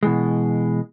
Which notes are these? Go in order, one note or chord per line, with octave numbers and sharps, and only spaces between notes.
B2 E3 G#3